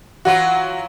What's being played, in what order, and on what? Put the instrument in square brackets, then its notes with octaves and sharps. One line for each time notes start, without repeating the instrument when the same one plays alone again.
[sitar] E3 F#3 F4 [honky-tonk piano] F#4